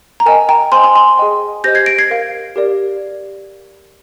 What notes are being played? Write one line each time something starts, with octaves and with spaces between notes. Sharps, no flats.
A#5
A#4 D#5 G5 G#5
G5 A#5
C5 D#5 G5 G#5 C6
G#5 C6
G#5 C6
G#4 D#5 G5
G4 C5 D#5 G6 A#6
G#6 C7
A#6 D7
G#6 C7
A#4 F5
G4 A#4 D5